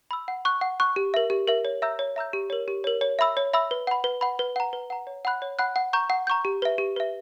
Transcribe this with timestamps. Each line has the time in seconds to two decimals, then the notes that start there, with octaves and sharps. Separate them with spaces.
0.11 B5 E6
0.28 F#5
0.45 C#6 F#6
0.61 F#5
0.80 C#6 F#6
0.96 G4
1.14 A#4 E5
1.30 G4
1.48 A#4 E5
1.65 C#5
1.82 E5 A#5 E6 G6
1.99 C#5
2.16 E5 A#5 E6 G6
2.33 G4
2.50 A#4 C#5
2.68 G4
2.84 A#4 C#5
3.01 C#5
3.19 E5 B5 E6
3.37 C#5
3.53 E5 B5 E6
3.71 B4
3.87 F#5 B5
4.04 B4
4.21 F#5 B5
4.39 B4
4.56 F#5 A#5
4.73 B4
4.90 F#5 A#5
5.07 C#5
5.25 F#5 B5 F#6
5.42 C#5
5.59 F#5 B5 F#6
5.76 F#5
5.93 A#5 C#6 G6
6.10 F#5
6.27 A#5 C#6 G6
6.45 G4
6.62 B4 E5
6.78 G4
6.96 B4 E5